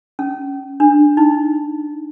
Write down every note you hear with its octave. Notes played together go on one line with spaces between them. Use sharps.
C#4
D4
D#4